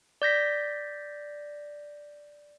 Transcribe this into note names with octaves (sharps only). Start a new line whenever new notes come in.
D5 G6 A#6 B6